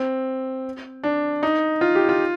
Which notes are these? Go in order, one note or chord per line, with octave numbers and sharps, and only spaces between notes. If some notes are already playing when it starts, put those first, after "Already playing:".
Already playing: C4
D4
D#4
F4
G4
F4